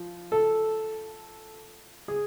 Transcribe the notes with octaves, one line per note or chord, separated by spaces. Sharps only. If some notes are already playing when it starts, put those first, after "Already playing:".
Already playing: F3
A4
G#4